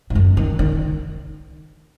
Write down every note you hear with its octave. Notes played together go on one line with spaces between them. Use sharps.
G#2
F#2
D#3
D#3